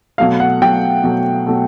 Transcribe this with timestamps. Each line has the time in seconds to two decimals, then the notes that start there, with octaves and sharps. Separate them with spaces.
0.18 B2 F#3 A3 F5
0.40 F#5
0.61 B2 F#3 A3 G5
1.04 B2 F#3 A3
1.47 B2 F#3 A3